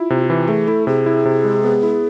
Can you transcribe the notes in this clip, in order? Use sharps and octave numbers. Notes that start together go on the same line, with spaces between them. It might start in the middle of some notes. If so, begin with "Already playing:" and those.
Already playing: E4 F4
C3
E3
A3 G#4
E4 A4
C3 G#4
E4
C3
G#3
B3
E4